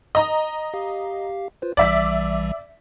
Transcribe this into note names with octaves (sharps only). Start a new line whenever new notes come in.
D#5 A#5
G4 F5
F4 B4 C5
A#1 E3 G3 D5 E5 B6